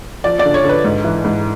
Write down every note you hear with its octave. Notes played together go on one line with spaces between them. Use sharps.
F3 D5
D5
D3
C#5
D3
B4
G#2
E3
G#2